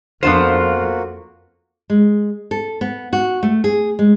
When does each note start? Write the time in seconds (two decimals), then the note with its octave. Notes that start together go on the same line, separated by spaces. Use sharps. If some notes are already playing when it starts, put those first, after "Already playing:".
0.23 F2 A#3 B3 D4 F4 F#4 C5
1.90 G#3
2.51 A4
2.81 B3
3.13 F#4
3.43 A3
3.64 G#4
3.99 G#3